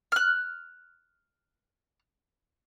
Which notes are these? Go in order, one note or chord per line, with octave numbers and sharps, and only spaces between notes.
F6 F#6